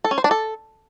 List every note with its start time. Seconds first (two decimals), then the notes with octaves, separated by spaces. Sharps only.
0.04 A4
0.11 C#4
0.18 C5
0.24 D4
0.31 A4